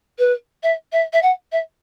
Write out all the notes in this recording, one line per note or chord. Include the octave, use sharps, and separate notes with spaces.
B4
E5
E5
E5
F#5
E5